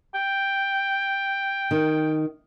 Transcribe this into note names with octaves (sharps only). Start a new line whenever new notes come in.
G5
D#3